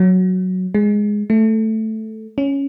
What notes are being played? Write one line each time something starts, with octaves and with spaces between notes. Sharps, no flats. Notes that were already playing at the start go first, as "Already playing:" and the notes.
Already playing: F#3
G#3
A3
C#4